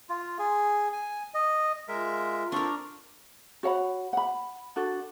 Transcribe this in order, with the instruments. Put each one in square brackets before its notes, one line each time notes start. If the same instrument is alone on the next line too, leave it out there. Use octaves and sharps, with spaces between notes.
[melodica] F4
G#4
G#5
D#5
[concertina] G#3 A#4 E5 [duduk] F4
[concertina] C4 A4 [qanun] D4 A#4 [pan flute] C#6
[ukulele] F#4 C#5 F#5 B5
F#5 B5
D4 F#4 A4